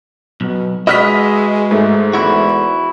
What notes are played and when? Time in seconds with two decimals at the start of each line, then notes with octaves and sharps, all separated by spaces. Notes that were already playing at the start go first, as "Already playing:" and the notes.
0.41 B1 B2
0.87 G#3 F#4 B4 D#5 E5 F6 B6
1.71 G#2 A3
2.13 E2 E4 F#4